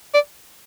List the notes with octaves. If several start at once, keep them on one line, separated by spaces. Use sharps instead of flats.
D5